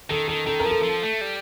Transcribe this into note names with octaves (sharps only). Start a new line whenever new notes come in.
D#3 A4
D#3 A4
D#3 A4
A#4
F3
A4
F3
A3
G3